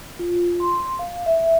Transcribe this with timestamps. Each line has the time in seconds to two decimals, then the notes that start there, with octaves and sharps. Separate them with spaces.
0.19 F4
0.60 C6
0.99 F5
1.26 E5